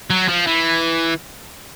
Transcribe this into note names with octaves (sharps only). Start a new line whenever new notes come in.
F#3
F3
E3